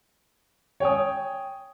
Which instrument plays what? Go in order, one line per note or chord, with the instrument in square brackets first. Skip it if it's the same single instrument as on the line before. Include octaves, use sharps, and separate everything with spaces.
[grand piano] C#5 G5 G#5 D#6